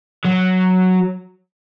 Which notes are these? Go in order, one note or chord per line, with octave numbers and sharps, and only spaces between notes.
F#3